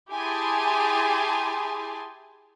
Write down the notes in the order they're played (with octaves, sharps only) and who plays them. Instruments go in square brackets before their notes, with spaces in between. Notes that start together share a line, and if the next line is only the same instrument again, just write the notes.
[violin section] E4 G4 G#4 G#5 A5 C6